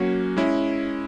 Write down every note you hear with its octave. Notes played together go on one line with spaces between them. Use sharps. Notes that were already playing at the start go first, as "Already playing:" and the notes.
Already playing: F#3 A#3 C#4 F#4
G#3 C#4 E4